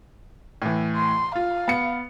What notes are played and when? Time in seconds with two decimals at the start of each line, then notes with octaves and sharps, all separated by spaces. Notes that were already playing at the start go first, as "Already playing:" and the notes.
0.62 A2 E3
0.97 C6
1.36 F4 F5
1.68 B3 C#7